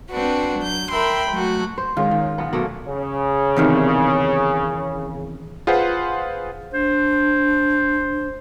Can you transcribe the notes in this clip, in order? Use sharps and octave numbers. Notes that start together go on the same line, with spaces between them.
C4 D4 F#4 B4
F#3 G6
A#4 E5 G5 B5 C6
F#3 A3 F#4
C5
G#2 D#3 G#3 C#4 F4
D#3
B1 B3
B2 F#3 A3 A#3
C#3
E2 C3 D#3
F4 G#4 B4 C5 F#5
D4 C5